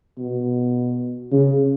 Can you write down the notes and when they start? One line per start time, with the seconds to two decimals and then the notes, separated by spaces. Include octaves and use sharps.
0.19 B2
1.32 C#3